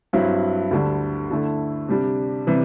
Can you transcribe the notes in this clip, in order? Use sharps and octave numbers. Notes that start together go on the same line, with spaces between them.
G2 F#3 C4 E4
D2 D3 G3
D3 A3 E4
C3 G3 D4
C3 E3 G3